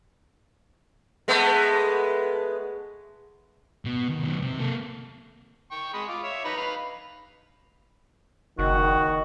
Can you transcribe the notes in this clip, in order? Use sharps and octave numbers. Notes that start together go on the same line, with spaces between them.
G#3 A3 B3
B2
D#3
D#3 F#3
C3
A#3 A4
G5 C#6
G#3 D#5 B5
F4 D6
C#5 E5
D#4 B4
B4 F5
F#1 D#3 F#4